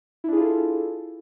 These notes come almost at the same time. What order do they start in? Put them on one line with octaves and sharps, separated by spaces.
E4 D4 G#4 F4 A4